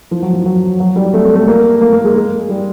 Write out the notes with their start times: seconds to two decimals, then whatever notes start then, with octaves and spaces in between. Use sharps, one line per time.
0.11 F3
0.22 F#3
0.33 F3
0.46 F#3
0.80 F#3
0.96 G3
1.14 A3
1.24 A3
1.35 A3
1.48 A#3
1.81 A#3
1.93 A#3
2.04 G#3
2.15 G#3
2.49 G3